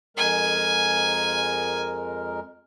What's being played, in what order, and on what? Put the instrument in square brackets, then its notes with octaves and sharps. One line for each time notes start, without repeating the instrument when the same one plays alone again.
[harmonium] F2 G#3 A#4 [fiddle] G#5